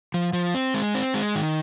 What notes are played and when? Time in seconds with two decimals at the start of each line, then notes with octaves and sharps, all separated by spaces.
0.14 F3
0.33 F3
0.54 C4
0.74 G#3
0.94 C4
1.14 G#3
1.35 D#3